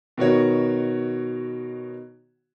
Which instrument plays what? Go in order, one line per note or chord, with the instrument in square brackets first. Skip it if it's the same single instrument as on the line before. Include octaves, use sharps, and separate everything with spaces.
[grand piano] B2 D#3 F#4 C#5